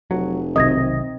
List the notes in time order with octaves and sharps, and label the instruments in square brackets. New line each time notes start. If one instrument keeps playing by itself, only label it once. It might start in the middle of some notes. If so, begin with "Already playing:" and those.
[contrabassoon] F1 [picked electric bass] F#3
[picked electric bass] B1 C3 D#3 [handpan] C4 D#5 [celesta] D#6 G#6 A#6